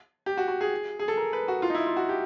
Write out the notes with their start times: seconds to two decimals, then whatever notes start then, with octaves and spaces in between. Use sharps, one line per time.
0.26 G4
0.37 F#4
0.48 F#4
0.61 G#4
0.99 G#4
1.08 A4
1.17 A#4
1.33 B4
1.48 F#4
1.62 F4
1.70 D#4
1.75 E4
1.86 F4
1.97 F#4
2.09 G4